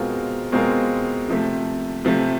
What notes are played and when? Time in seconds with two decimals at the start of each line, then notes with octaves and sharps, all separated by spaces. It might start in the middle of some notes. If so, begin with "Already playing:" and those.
Already playing: B2 G#3 C4 F4 A#4
0.52 B2 G#3 C4 F4 A#4
1.28 C3 F3 A3
2.05 C3 F3 A3